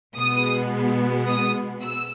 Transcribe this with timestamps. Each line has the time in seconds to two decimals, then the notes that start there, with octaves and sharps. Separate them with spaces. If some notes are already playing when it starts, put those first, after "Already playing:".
0.16 B2 G#3 B3 D#6
1.28 D#6
1.83 E6